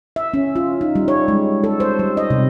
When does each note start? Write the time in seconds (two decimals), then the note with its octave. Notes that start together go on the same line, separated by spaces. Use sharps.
0.16 E5
0.34 C#4
0.56 F4
0.81 D#4
0.95 G3
1.08 C#5
1.28 G#3
1.64 A4
1.80 C5
1.99 G3
2.17 D#5
2.30 C3